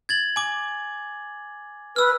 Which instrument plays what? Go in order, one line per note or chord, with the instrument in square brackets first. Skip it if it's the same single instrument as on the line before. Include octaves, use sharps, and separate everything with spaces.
[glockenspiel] G#6 A6 F#7
G#5 D6
[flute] B4 [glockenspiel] E6 F6